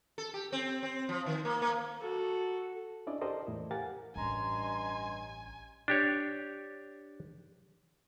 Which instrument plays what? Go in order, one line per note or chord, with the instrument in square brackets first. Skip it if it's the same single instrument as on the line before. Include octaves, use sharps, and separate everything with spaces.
[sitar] A4
G4
C4
C4
F3
D#3
A#3
A#3
[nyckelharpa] F#4 A4
[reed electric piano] C#4 D4 E4 D5 D#5
G4 A4 A#4 C5 D5 D#5
E2 A2 E4
G4 A#4 F5 F#5 G#5 A6
[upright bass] A1 [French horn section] G2 C#4 D#5 [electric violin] G#5 [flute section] A#5 C6
[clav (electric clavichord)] D4 G4 C#5